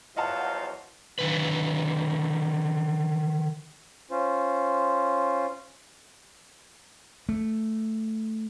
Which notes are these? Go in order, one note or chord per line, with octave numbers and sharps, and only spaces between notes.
E2 F3 F#3 F4 D#5 F5 F#5 A5
D3 D#3 B4
C#4 F4 C5
A3